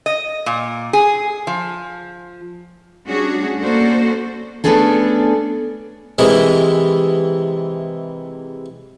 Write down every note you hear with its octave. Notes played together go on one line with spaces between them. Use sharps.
D#5
A#2
G#4
F3
G3 A3 C#4 D4 F#4 G#4
A#3 C#4 F#4 A4 C5 D5
A3 B3 C#4 D4 G#4 A4
C3 D#3 E3 G#3 E4